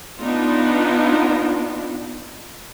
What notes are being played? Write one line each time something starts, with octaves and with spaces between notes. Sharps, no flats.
B3 D4 D#4 F4